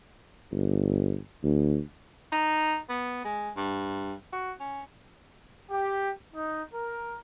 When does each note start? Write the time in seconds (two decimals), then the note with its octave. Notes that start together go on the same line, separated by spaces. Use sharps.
0.52 G1
1.43 D2
2.32 D#4
2.89 B3
3.25 G#3
3.57 G2
4.33 F#4
4.60 C#4
5.71 G4
6.34 D#4
6.74 A#4